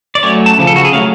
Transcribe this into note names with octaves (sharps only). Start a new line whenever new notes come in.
D5
F#3 A3 C#4 C#5
A5
C#3 F3
A4
F#4
G#4
F#3 A3 C#4 F5